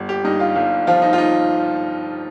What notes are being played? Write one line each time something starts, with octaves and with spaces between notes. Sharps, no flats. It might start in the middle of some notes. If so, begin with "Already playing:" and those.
Already playing: G1
G4
G2 D#4
F4
G1 F4
F3 F4
D#4
F4
D#4